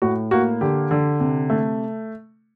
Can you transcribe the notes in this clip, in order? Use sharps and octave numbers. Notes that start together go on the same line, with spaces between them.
A2 F#4
A#3 F#4
D3 G4
D3
C3
A3